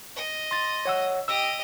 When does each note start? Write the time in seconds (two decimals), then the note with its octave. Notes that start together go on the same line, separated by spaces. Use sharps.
0.16 D#5
0.51 C6 A6
0.85 C#5 F#5 E6
1.28 G4 D#5 E6